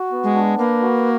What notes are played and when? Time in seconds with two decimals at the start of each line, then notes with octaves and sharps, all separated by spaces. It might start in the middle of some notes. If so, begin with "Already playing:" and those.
Already playing: F#4
0.12 B3
0.24 G#3
0.35 D4
0.58 A#3 B4
0.82 F#4